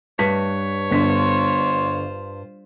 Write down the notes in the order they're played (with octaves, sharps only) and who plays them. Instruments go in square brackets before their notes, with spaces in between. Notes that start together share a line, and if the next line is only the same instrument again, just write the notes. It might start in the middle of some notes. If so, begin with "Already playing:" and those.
[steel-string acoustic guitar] G2 [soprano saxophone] C#5 [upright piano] B6
[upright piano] G1 D3 B6 [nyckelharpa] F4 C5